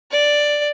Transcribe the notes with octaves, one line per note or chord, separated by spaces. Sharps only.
D5